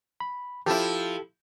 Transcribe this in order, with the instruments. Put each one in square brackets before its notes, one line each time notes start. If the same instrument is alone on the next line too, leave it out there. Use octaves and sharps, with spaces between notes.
[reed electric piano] B5
[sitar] F3 E4 [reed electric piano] G4 A4